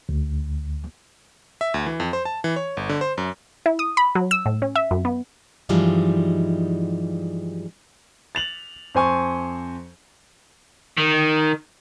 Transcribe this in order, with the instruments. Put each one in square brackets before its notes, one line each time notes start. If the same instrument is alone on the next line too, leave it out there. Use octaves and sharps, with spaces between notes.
[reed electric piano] D2
[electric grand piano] E5
D2
E3
F2
C5
A5
E3
C#5
G1
D3
C5
F#2
[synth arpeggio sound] E4
D#6
B5
F#3
E6
A2
C#4
E5
F#2
B3
[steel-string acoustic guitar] G2 E3 F3 G3 G#3 D#4
[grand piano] A6 F7 F#7
F2 C5 G#5 C#6
[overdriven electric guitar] D#3